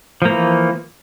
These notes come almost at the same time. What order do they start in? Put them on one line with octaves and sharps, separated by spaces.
F3 A#3 E3